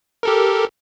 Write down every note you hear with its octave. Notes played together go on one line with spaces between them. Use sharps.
G4 A4 A#4